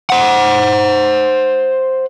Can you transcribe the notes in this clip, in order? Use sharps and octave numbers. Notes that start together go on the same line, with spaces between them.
C5 F#5